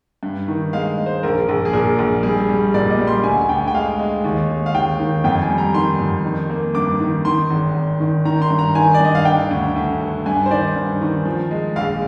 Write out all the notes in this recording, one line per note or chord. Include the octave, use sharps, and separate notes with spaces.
G2
D#3
G#3 F5
G#3
C5
A#1 A#4
A#1
G#4
A#2 A#4
A#1
G3 G#4
G3
A#2 D5
D#5
G3
C6
D2 G#5
D2 G5
G5
G#3 F5
G#3
D#2
G#3
F5
D#2 G5
D#3
F2 G5
G#5
G3
A#5
D#3 C6
F2
D#3
A#3
G2 D6
D#3
D#3 C6
G#1
G#1
D#3
D#3 A#5
C6
G2
A#5
D#3 G#5
D5
G2 D#5
F5
D3 G5
D2
D2
D3
G2 G#5
C5
D#3 D5
G2
D#3
F3
G#3
A#1 F5